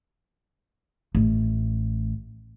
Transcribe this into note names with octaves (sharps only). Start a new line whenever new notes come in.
A1 A3